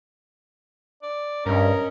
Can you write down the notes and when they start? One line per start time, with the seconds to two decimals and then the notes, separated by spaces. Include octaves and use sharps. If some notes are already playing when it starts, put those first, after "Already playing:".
1.03 D5
1.46 G2 C#4 A#4 D#5